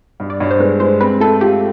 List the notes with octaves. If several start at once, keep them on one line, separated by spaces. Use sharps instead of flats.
G2
D5
G2 C#5
C5
G#3 B4
G#3 C5
C4 B4
A3 A4
F4 G4